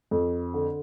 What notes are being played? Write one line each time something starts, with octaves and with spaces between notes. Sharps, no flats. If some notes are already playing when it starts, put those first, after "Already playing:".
F2
D3